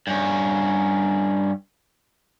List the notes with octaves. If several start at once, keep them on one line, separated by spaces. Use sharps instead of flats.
G2 C#4